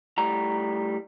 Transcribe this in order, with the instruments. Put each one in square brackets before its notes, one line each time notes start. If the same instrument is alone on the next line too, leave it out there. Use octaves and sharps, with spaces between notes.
[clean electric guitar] A2 G3 A#5